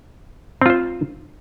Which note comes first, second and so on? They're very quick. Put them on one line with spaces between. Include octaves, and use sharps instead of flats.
C4 F4 C5